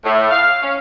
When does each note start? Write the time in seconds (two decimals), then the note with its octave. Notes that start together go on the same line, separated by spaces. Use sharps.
0.04 A2
0.31 F5
0.62 C#4